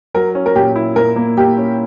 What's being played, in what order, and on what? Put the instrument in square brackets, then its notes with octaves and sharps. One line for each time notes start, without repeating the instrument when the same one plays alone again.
[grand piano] F#3 [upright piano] A#4
[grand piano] C#4
[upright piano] A#4
[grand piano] A#2 [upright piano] G4
[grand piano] E4
[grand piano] A#2 [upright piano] A#4
[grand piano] A#3
[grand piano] A#3 [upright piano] G4
[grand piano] C#4